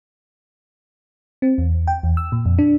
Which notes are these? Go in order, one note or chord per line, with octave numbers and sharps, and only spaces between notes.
C4
E2
G5
E2
E6
A#2
F2
D4